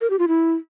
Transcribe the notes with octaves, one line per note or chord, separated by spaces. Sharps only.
A#4
G4
F4
E4